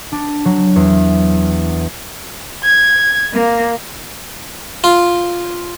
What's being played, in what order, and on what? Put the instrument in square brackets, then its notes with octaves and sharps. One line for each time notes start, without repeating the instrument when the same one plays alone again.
[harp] D4
F#3
E2
[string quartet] G#6
A#3
[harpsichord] F4